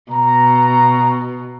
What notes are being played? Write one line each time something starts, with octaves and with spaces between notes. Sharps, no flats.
B2 A#5